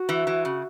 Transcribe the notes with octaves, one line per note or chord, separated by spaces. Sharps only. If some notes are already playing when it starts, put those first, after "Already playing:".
Already playing: F#4
E3
E3
C#3